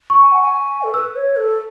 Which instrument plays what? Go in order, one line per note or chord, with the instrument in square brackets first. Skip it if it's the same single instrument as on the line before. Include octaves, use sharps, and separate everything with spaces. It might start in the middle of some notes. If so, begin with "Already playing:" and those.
[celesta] C#6
[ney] G#5
F#5
G#5
A4
[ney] B4 [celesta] E6
[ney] C#5
A4